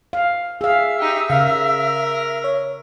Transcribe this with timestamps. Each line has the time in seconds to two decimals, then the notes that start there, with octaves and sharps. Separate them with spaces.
0.13 F5
0.61 G#4 E5 F5 E6
0.99 D#4 G4
1.30 C#3 A#4 F5
2.44 C#5